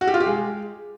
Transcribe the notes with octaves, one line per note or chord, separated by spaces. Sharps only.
F#4
G4
F4
G4
G#3